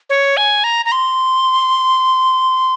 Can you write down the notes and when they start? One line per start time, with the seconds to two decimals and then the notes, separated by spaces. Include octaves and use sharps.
0.10 C#5
0.37 G#5
0.64 A#5
0.85 A#5
0.92 C6